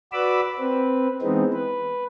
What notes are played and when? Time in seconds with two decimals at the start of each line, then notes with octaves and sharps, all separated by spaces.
0.13 F#4 B4 D5 B5 D6 E6
0.59 C4 B4
1.22 E3 G#3 B3 C4 D#4
1.52 B4